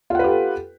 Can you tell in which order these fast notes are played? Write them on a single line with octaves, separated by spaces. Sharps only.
F4 F#5 B4 G4 A4